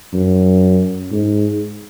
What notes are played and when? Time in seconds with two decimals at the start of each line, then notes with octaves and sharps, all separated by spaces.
0.13 F#2
1.12 G#2